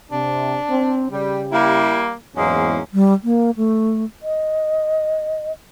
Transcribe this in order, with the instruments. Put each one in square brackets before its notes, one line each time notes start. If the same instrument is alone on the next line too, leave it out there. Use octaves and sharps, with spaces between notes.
[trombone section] C3 [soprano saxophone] D4
[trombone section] C4
[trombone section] C#3 G4 [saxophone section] G3
[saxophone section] G3 A#3 [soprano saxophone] E4
[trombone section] E2 G#2 [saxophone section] F#3 G#3 A#3 [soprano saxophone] C#4
[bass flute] G3
A#3
A3
D#5